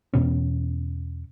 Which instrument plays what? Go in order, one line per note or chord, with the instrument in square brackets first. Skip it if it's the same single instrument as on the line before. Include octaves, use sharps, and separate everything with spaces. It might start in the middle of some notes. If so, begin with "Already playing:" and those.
[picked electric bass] E2 B2 C#4